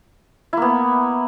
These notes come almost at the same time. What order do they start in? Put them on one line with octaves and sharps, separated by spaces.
E4 A#3 B3